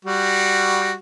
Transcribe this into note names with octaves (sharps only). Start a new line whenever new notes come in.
G3 F#4